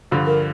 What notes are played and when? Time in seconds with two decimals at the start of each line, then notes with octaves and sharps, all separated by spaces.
0.11 G2 D3 F3
0.26 A#4